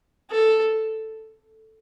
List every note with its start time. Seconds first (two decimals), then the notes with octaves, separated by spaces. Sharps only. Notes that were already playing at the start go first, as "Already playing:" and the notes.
0.31 A4